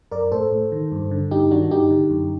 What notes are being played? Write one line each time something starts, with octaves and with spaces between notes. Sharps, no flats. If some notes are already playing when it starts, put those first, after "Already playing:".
F#2 A#4 D5
A2 A4 C5
A2
D#3
G2
D3
G2 D#4 G4
D#3 D4 F#4
G2 D#4 G4
D3
F#2